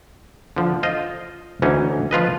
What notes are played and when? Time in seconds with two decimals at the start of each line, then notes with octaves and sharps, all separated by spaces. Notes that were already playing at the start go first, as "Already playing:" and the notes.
0.56 D3 F3
0.83 F4 C5 D#5
1.62 D2 E3 C#4 D#4
2.11 F3 F4 B4 D#5